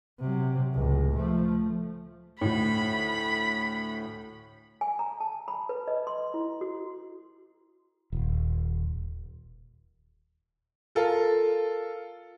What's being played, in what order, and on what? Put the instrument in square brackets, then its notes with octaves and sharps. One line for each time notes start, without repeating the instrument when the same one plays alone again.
[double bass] C3 F#3
C#2 A2
F3 A3
[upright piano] D2 A2 [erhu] B5
[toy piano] G#5
A#5
A5
B5
B4
D#5
C6
E4
F#4
[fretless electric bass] D#1
[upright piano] F4 A4 A#4